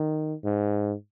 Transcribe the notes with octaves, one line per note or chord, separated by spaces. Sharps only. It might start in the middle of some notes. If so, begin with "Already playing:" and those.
Already playing: D#3
G#2